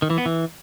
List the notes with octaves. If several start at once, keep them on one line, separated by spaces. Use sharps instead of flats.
D#3
E3
B3
E3